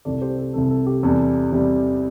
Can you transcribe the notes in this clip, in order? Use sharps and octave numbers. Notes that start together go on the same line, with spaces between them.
C2 C3 A3 A4 D5
G4 C5
A4
C2 C3 A3 A4
A4
G4
E2 C3 G3 A4
E2 C3 G3